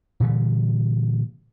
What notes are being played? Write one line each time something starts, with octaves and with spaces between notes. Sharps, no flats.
A#2 D3 E3 G3